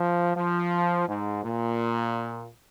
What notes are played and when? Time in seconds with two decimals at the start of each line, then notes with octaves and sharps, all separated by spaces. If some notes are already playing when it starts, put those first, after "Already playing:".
Already playing: F3
0.37 F3
1.08 G#2
1.44 A#2